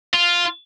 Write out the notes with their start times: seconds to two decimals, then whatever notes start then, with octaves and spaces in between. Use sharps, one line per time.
0.14 F4